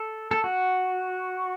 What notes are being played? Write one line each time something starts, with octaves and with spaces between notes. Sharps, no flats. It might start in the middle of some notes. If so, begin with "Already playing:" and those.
Already playing: A4
A4
F#4